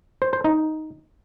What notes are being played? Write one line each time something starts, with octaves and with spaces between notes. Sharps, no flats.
C5
C5
D#4